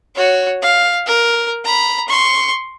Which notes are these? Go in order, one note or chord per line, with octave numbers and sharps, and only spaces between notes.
F#4 C#5
F5
A#4
A#5 B5
C6 C#6